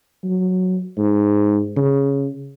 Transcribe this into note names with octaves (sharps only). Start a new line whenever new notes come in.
F#3
G#2
C#3